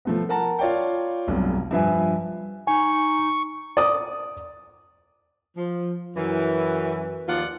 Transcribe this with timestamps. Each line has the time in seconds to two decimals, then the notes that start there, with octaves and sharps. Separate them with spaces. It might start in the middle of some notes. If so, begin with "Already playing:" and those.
0.05 F3 A3 B3
0.29 A#4 F#5 A5 A#5
0.59 F4 C#5 D5 F5 G5
1.27 F1 B1 G2
1.71 G2 F3 B4 E5 G#5
2.67 D#4 G#5 C#6
3.77 D5 D#6
5.57 F3
6.17 F#2 E3
7.28 D#2 F3 F4 D5 F#5